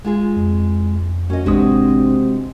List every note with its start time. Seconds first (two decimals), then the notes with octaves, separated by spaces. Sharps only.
0.04 G#3 F4 G#4
0.36 F2
1.30 F#2 C#4 D#5
1.46 A1 C3 G#3 C4 D4 F#4 D#6